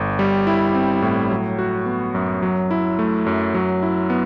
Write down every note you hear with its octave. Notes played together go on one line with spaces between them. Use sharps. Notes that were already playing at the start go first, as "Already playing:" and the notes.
Already playing: G1
G3
E4
C4
A2
F#3
F#4
B3
F#2
F#3
E4
A3
F#2
F#3
E4
B3